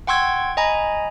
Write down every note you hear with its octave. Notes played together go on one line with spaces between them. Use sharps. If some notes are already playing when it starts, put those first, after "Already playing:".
F#5 G5 C6 C#6 E6 G#6
D#5 G#5 A#5 B5